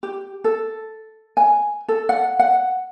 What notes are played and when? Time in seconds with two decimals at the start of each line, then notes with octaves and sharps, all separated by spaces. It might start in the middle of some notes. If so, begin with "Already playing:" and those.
0.03 G4
0.44 A4
1.37 G#5
1.88 A4
2.09 F#5
2.39 F#5